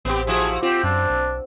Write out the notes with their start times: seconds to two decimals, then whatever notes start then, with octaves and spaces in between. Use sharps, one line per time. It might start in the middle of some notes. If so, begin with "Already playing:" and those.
0.05 A1 B3 C4 G4
0.27 F3 E4 F#4 G#4
0.63 C4 F4 G4
0.84 F#2 D4
1.10 B1